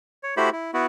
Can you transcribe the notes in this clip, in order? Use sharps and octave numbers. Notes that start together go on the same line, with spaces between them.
C#5
A3 E4 F#4 G4 C5 B5
E4
B3 E4 F#4